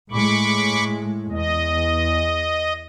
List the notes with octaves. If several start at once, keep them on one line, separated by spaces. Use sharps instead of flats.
A2 G#3 B5 C#6 D6
E2 D#5